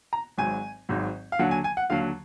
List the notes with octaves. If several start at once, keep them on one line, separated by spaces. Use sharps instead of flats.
A#5
G#1 G#2 F#3 G#5
G#1 G#2 F#3
F5
D#2 D3 F#3 F#5
G#5
G#5
F#5
D#2 D3 F#3 F5